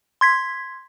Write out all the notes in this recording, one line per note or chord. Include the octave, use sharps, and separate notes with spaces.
C6 G#6 B6